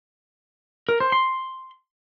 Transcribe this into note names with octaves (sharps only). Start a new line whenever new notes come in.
A#4
C5
C6